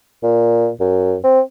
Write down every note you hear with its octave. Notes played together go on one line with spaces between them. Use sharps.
A#2
F#2
C4